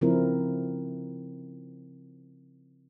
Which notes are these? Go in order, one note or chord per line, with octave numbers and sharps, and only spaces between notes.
C#3 F3 A3 C4 E4 A#4